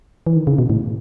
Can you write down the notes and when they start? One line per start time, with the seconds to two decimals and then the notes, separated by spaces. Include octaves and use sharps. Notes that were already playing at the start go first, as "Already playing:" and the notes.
0.27 E3
0.36 D#3
0.47 C#3
0.59 B2
0.70 A2